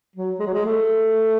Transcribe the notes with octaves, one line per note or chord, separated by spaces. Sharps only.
F#3
G#3
F#3
G#3
A3